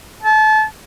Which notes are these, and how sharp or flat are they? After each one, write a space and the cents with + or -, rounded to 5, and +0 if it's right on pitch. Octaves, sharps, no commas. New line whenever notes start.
A5 -30